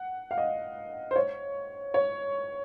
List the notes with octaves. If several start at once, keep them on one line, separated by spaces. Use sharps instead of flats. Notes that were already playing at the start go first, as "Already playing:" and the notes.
Already playing: F#5
F5
D#5
C5
C#5
C#5